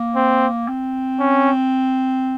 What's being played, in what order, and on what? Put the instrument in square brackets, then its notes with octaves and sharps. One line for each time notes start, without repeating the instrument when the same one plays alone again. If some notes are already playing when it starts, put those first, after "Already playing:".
Already playing: [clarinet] A#3
[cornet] C4
[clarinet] C4
[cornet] C#4